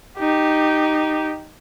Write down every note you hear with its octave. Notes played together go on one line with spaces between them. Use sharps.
D#4 G4